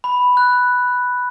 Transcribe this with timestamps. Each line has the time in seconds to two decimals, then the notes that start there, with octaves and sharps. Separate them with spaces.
0.04 B5
0.37 F#6